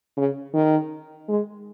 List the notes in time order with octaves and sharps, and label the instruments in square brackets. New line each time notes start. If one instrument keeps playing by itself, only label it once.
[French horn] C#3
D#3
G#3